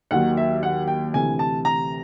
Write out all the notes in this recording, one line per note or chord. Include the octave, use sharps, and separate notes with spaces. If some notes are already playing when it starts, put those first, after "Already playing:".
D#2 D#3 F#3 F#5
E5
F#5
G5
D2 C3 E3 G#5
A5
A#5